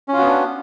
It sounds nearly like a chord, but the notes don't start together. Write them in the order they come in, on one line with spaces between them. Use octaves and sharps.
C#4 F4 F#4 B3 D4